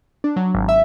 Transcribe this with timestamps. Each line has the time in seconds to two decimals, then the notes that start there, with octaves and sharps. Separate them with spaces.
0.24 D4
0.36 F#3
0.54 G#1
0.69 E5